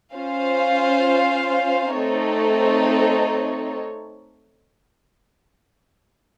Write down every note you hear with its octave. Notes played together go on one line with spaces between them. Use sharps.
C#4 F4 C5 F5
A3 C4 D#4 A4 C#5